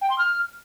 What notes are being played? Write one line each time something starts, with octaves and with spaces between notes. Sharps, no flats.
G5
C6
F6